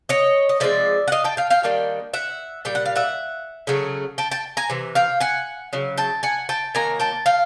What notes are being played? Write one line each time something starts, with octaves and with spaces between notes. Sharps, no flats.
C#5 D#5
D#5
D3 F3 G#3 C4 D5 E5
F#5
D#5 F5
G5 A5
F5 G5
F5 G5
D#3 G3 A#3 D4
E5 F#5
A#2 G3 G5
F#5
F5
E5 F#5
C#3 F#3 A3
G5 A5
G5 A5
G#5 A#5
C3 E3
F5 G5
F#5 G#5
C#3 F#3
G5 A5
F#5 G#5
G5 A5
D#3 F#3 A#3 G#5 A#5
G5 A5
F5 G5